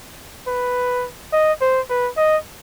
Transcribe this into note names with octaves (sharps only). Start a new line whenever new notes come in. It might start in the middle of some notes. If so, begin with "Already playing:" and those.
B4
D#5
C5
B4
D#5